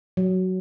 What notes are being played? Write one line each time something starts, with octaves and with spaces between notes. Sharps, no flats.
F#3